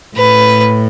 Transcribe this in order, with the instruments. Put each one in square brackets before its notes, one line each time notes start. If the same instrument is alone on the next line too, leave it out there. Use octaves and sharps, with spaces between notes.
[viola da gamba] A2 [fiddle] B4